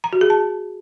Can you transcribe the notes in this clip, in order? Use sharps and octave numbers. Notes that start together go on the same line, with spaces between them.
A#5
F#4
G#4
A5